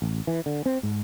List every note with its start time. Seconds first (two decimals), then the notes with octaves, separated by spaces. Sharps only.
0.02 A1
0.27 E3
0.46 D3
0.66 C4
0.83 G#2